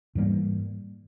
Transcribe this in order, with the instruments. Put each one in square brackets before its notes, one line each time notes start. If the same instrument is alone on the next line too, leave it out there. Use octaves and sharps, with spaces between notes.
[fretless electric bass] G#2 E3 G3 A#3